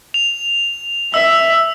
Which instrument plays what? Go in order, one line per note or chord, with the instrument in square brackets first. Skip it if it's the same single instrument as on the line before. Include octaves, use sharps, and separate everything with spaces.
[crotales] F7
[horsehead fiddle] E5 [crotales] E6